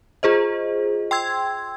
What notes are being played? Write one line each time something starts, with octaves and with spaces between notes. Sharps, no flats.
F4 G#4 C5 D#5
G5 C6 E6 G#6